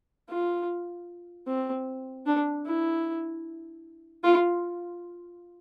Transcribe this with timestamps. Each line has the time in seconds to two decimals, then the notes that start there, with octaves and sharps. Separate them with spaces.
0.29 F4
1.47 C4
2.26 D4
2.66 E4
4.23 F4